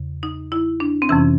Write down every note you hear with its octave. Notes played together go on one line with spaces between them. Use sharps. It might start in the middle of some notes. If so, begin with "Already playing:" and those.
Already playing: E2 C#3
D#4
E4
D4
C4
F2 C3 E3 C#4